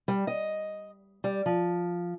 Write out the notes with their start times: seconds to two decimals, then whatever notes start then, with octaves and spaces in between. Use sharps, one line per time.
0.08 G3
0.27 D#5
1.24 G3
1.46 F3